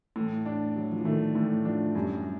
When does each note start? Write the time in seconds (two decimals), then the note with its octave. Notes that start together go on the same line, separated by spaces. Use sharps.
0.16 A2 E3
0.46 D4
0.76 F#3
0.91 F3
0.98 E3
1.05 D#3 A3
1.35 A2 E3
1.65 F3 D4
1.95 F#2 G3